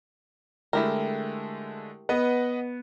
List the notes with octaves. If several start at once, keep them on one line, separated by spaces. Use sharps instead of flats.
D3 G#3 A3 E4 G4 A#4
B3 B4 D#5 F#5